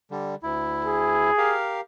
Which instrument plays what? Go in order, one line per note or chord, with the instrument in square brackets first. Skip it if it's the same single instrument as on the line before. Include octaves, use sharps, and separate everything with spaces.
[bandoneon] D3 G3
D2 E4
[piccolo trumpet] G#4
[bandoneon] G4 A#4 F5